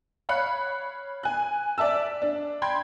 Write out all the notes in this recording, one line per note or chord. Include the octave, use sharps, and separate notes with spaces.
C#5 F5 B5 F#6 C#7
G#5 F#6
D5 E5 A5 E6
D4
G5 B5 C6 G#6